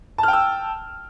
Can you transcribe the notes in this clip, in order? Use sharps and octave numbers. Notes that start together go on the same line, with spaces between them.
G5 A5 E6 F6